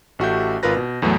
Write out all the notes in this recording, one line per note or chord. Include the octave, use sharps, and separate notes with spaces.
A1 A3 F#4 G4 E5 G6
G#1 F4 A#4 B4 A#6
B2
E2 A2 E3 F#3 A3